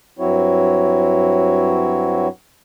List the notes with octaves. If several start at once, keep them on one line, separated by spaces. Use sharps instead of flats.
G2 F#3 C4 E4 F#4 C#5